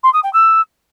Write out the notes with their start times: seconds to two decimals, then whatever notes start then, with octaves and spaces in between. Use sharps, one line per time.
0.03 C6
0.13 D#6
0.23 G5
0.33 E6